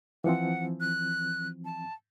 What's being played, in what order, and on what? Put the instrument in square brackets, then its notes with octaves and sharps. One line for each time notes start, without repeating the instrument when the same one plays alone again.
[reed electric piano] E3 F3 C4 [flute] F#5
[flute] F#6
A5